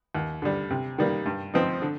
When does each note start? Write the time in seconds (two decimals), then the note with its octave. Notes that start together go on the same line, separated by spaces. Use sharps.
0.15 D#2
0.42 D3 G3
0.70 C3
0.98 D#3 G3 A#3
1.26 G2
1.54 F3 C4 D#4
1.82 D3